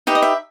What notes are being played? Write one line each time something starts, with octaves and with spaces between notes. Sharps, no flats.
D#4 G4 B4 E5
D#5
E5